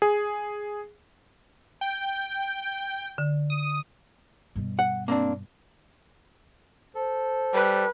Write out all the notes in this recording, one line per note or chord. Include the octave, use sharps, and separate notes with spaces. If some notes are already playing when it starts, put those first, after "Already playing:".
G#4
G5
D3
D#6
G2 B2
F#5
A#3 C4 D4
A4 C5
G3 B4